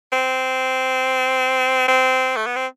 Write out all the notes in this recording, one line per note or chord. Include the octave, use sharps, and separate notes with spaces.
C4
C4
A3
B3
C4